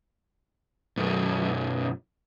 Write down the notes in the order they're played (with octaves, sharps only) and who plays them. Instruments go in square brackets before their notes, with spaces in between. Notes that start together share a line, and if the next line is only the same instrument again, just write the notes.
[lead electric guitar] B1 F#2